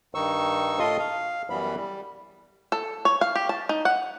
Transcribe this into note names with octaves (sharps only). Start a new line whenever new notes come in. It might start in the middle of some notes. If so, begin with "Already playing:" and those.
G2 D#3 D#4 C#6 E6
A2 F4 A4 D#5 C6 D#6
F5
F#2 E3 G3 B3 B5
G3
A4
C#5
F5
G4
A5
D#4
F#5